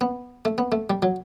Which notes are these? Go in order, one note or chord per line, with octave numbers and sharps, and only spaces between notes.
B3
A3
B3
A3
G3
F#3